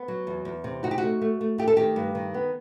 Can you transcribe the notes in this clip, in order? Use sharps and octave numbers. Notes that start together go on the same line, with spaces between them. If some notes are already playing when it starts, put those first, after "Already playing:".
Already playing: B3
F#3
E2
E2
C3
D#4 F#4
G4
A3 F#4
A3
A3
A3 G4
A4
D#3 G4
G2
D#3
B3